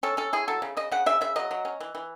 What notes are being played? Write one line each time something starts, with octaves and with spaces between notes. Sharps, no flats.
C#4 A4
C#4 A4
E4 G#4
F#3 A4
C#3
C#3 D#5
C#3 F#5
C#3 E5
C#3 E5
F#3 D#5
F#3
C#4
E3
E3